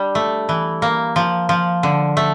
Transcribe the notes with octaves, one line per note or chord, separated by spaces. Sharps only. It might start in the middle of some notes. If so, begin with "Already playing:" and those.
Already playing: G3 D4
A3
E3
A#3
F3
F3
D3
A3